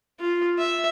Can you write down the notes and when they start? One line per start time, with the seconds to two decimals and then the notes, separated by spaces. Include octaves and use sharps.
0.19 F4
0.58 E5